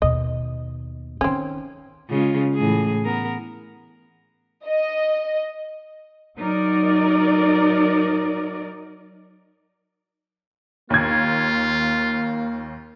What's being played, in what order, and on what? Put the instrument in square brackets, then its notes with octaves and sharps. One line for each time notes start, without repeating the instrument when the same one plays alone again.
[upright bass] D#2 B2 [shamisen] D#5
[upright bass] D#3 D#4 [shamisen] C4 C#4
[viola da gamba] C#3 G#3 F4
A2 E3 G#4
B3 A#4
[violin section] D#5
[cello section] F#3 D#4 A#4 D5
[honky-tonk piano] D#2 G#6 [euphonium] A#3 [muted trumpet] F4